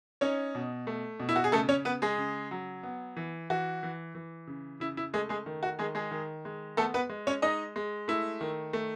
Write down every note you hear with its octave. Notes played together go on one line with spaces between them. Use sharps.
C#4 D#4 C#5
B2
A3
B2
E4
F#4
G#4
C#3 A3 A4
C#4 C#5
B3 B4
G#3 G#4
C#3
F#3
B3
E3
E3 F#4
E3
E3
C#3
C#3 E4
E4
G#3 A3 G#4
G#3 G#4
D#3
F#4
D#3 G#3 G#4
G#3 G#4
D#3
G#3
A3 B3 A4
B3 B4
G#3
C#4 C#5
G#3 D#4 D#5
G#3
A3 E4
D#3
A3